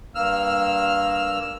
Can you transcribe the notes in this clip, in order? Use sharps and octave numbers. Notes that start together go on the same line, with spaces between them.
G2 A#3 E6 F6